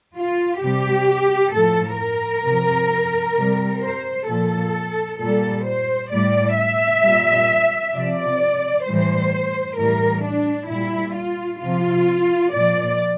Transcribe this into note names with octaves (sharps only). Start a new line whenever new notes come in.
F4
C3 G3 G4
A2 F3 A4
A#4
C3 F3
C3 G3
C5
A#2 F3 A4
A#2 G3 A4
C5
A2 G3 D5
E5
A#2 G3
C3 F3 D5
A2 E3 G3 C5
A2 E3 G3 A#4
D4
A#2 G3 E4
F4
C3 F3 F4
A#2 F3 D5